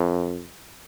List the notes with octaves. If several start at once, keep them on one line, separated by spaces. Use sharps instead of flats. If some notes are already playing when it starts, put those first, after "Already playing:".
Already playing: F2